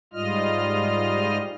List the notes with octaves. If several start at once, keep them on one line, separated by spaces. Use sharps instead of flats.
G#2 G3 F4 D#5 F6